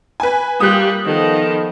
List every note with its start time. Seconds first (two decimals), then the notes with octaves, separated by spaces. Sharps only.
0.20 B4 G#5
0.60 G3 A#3 F4 G4 D#6 F#6
1.05 D#3 F3 B3 A4